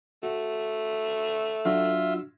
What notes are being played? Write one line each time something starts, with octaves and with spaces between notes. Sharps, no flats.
A3 F#4
F#3 D4 F4 F#4 E5